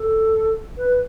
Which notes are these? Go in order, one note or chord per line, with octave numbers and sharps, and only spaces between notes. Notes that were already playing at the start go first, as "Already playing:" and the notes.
Already playing: A4
B4